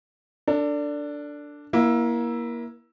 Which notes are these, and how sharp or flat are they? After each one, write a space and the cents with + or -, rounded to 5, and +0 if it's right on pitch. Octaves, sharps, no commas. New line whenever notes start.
D4 -5 A4 +35
A#3 +25 E4 +0